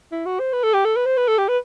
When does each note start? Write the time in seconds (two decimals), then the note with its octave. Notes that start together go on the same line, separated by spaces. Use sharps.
0.12 E4
0.25 F#4
0.40 C5
0.53 B4
0.63 A4
0.74 G4
0.85 A4
0.96 B4
1.06 C5
1.17 B4
1.28 A4
1.38 G4
1.48 B4